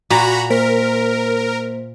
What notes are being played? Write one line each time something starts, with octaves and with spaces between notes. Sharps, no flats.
A#2 F#4 A#5 B5
A#3 A#4 C5 B6